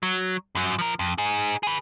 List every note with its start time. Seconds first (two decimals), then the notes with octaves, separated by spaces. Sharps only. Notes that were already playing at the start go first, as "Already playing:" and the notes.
0.03 F#3
0.55 F#2 F#3
0.79 F3 A#4
0.99 F2
1.18 D#4 G#4
1.63 G#4 B4